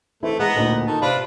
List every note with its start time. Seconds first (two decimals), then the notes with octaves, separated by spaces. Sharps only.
0.23 E3 A3 C4 E4
0.39 G#3 B3 A#5
0.56 D2 A#2 D#4
0.87 D#3 A4
1.02 C3 D4 F4 B4